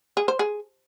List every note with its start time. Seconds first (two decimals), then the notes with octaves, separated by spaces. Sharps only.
0.17 G#4
0.28 C5
0.39 G#4